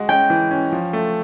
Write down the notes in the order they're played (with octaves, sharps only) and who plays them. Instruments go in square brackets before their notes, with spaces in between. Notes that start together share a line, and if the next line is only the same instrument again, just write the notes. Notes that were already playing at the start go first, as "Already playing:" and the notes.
Already playing: [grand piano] G#3 F#4
[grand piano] C#4 [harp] G5
[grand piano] E3
C#4
F3
A3